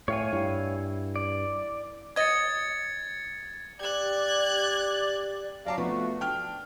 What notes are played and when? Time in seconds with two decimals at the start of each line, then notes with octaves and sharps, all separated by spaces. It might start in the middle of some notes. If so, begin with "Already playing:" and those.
0.08 A2 C#5 F5 G#5
0.33 G2 E4
1.16 D5
2.16 F#3 D#5 G#6 A6 C#7
3.80 G4 D5 F#6 G#6
5.66 F#3 D5 F5 A5 A#5 D6
5.78 F3 A3 B3 F#4 B4
6.21 D4 G5 F6